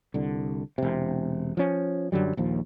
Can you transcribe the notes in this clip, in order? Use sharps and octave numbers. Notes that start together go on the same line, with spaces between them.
C2 D3
E1 C3
F3 C#4
F#2 D3 F#3 G3
A#1 D#2 F3